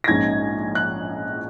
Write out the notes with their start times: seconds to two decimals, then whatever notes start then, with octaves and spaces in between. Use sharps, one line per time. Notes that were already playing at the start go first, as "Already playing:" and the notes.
0.04 A#6
0.08 A#1 G#2 G#3 C#4 G#6
0.75 F#6